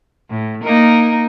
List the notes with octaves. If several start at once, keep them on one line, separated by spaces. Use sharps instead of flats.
A2
A#3 D#4 A#4